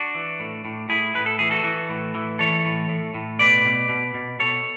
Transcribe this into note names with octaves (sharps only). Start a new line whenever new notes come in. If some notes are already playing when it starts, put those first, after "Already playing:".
Already playing: D4 F#4
E3
A2
A2
A2 E4 G#4
A2 B4
A4
E3 G#4
F#4 A4
E3
A2
E3
E3 A4 C#5
A2
A2
A2
B2 B4 D5
B2
B2
B2
B2 A4 C#5